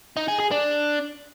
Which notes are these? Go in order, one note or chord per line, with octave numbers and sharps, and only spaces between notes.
D#4
G#4
G#4
D4